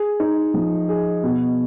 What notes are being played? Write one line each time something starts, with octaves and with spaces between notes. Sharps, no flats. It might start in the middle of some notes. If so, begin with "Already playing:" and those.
Already playing: G#4
D#4
F3
G#4
B2